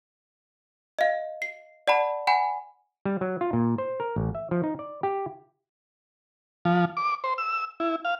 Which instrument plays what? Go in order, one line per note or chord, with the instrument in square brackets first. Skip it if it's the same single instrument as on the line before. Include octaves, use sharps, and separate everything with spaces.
[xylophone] D#5 F5
C7
D5 F#5 A5 B5
F#5 G#5 B5
[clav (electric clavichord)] G3
F#3
F4
A#2
C5
A#4
A1
E5
F3
D#4
D5
G4
[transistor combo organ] F3
D6
C5
E6
E4
F5